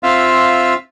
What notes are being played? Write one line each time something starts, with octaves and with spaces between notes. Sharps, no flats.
C4 F4 E5 F5